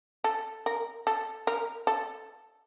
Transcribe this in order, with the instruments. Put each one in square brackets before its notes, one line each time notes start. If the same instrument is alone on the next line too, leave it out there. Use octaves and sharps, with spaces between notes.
[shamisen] A4
A#4
A4
A#4
A4